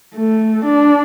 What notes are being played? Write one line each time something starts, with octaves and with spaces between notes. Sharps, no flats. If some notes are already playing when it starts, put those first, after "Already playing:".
A3
D4